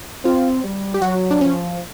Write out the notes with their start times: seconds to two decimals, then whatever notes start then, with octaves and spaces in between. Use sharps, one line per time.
0.25 C4 F4
0.64 G3
0.94 G4
1.01 F#3 F#4
1.31 D4
1.41 F3 C#4